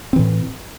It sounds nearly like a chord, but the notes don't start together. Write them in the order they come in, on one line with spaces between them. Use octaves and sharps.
C4 E3 A2